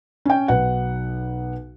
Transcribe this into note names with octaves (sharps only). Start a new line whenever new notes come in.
C#4 G5
B1 B4 F#5